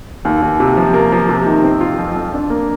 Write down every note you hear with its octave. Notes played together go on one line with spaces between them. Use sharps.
D#2
D#2
C3
F3
A#3
F3
C3
D#3
C4
F4
F2
F2
D4
A#3